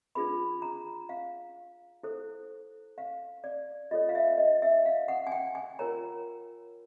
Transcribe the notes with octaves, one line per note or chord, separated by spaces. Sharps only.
D4 F4 G#4 B4 B5
A#5
F5
E4 A4 C5
F5
D5
F4 A4 C#5 D#5
F5
E5
D#5
E5
F5
F#5
G#5
G5
G#5
F4 A#4 C#5 A#5